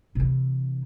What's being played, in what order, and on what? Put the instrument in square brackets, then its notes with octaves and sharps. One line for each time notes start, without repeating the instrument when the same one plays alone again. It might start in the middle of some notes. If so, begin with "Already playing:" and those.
[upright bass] C3 E3